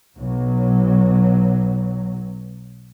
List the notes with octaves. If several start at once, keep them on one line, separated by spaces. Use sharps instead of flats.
B1 F#3